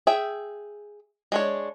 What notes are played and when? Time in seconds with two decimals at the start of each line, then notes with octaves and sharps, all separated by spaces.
0.07 G#4 E5 G5
1.32 G#3 D4 C#5